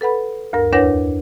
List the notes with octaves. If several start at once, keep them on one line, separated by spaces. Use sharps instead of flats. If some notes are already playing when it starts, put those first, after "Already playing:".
A4 B4 F#5 B5
D2 G2 A#4
E2 D4 B4 C#5 F#5 A#6